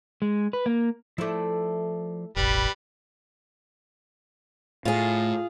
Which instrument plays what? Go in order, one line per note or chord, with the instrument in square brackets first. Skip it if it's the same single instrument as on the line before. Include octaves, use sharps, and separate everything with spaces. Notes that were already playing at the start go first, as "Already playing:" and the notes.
[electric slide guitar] G#3
B4
A#3
[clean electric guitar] F3 C5 D5 [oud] A3 E4
[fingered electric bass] E1 A1 [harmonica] G3 B4
[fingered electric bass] A2 [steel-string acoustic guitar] F4 G#4